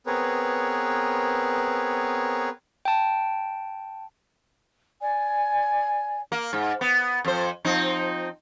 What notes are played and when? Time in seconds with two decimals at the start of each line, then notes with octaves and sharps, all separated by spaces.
0.07 B3 C4 G#4 A#4 B4 C#5
2.85 G5 A5
5.01 D5 G#5
6.32 A#3
6.53 G#2
6.81 B3
7.24 F2 C5
7.65 F3 C4 D#4